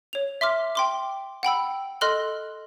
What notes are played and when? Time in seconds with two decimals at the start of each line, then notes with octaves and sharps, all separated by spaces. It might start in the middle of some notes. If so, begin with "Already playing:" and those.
0.13 C#5 F7
0.41 E5 C6 D6 F6
0.75 G5 C6 D6
1.43 F#5 G5 B5 E6
2.01 A4 D#5 C6 F6 F#6 F#7